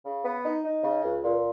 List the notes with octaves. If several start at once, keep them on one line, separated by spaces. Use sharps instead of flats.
C#3
B3
D#4
D#4
C#3
C#2
A#2